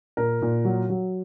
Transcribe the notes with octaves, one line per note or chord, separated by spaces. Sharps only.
A#2 A#4
A#2
F#3
F#3